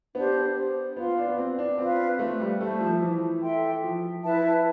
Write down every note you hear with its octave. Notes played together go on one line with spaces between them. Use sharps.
B3 D4 G4 C5
B3 F4 B4 F5 C6
D4
B3
C4
D4
C4 F4 B4 F5
A3
G3
A3 A4 C5 E5 A5
F3
E3
A4 E5 G5 C6
F3
E4 B4 E5 A5